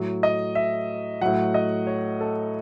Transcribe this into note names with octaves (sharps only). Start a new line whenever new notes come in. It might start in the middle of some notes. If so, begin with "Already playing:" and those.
Already playing: A2 F#3
D#5
E5
A2 F#3 F#5
D#5
C#5
A4